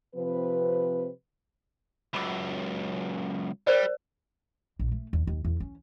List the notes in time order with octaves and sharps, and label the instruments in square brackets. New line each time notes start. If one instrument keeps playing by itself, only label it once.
[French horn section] C3 F3 C4 B4
[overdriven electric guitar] C#2 F#2 [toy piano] B5 D6
[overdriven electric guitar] G3 [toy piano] A#4 C5 D5
[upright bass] A#1
A3
D#2
D#2
E2
C#4